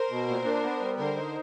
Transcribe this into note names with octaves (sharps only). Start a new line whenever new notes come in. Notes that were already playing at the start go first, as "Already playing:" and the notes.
Already playing: A#4 C5
B2
A#2
D4
B3
G3
D3 A#4 C5
D#4